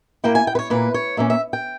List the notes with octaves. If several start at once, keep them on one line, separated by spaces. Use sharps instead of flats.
A#2 A#3 E4 G5
G#5
G5
B4
C#5
A#2 A#3 E4 B4
C#5
A#2 A#3 C#4 E5
E5
G5